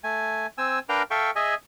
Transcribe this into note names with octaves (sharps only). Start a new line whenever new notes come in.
A3 G#5
C4 G#5 E6
D4 A#4 B4 F5 G5 A#5
A4 E5 F5 G5 C#6
G#4 D#5 E5 G#5